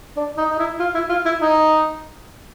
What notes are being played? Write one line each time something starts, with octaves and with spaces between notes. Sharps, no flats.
D4
D#4
D#4
E4
F4
E4
F4
E4
D#4